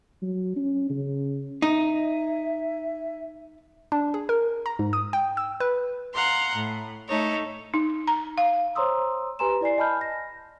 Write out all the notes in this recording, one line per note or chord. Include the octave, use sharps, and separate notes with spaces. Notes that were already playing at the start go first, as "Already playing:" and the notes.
F#3
C#4
C#3
D#4 E5
D4
G#4
A#4
A#5
G#2
D#6
G5
E6
B4
F5 F#5 A#5 C6
A2
A3 D#4 A4 C#5
D#4
A#5
F5
C5 C#5 A#5 C6 D#6 E6
G4 B4 G#5 A#5 C6 E7
E4 D5 G#5 C7
D#5 G#5 A5 B5 F6 G6
A#6